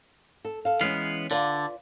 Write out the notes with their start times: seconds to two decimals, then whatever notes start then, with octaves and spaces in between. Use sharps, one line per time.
0.45 A4
0.65 A4 F5
0.81 E3 G#3 B3 C#4 F5
1.31 D3 F4 B4 D5